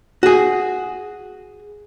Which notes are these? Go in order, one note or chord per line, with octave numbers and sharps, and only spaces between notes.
F#4 G#4